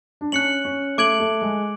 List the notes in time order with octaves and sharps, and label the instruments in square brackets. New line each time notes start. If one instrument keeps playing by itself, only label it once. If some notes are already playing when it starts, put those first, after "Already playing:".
[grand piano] D4
[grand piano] C#4 [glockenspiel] F#6 C#7 F#7
[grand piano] C#4
[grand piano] A3 [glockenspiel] D6 G#6 D7 F#7
[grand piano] A3
G#3